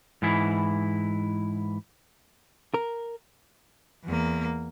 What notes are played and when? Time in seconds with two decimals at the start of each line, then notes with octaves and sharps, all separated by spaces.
0.22 G#2 E3 E4
2.74 A#4
4.05 E2 A#3